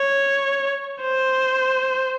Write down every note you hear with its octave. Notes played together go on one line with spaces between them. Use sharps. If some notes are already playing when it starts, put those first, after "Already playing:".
Already playing: C#5
C5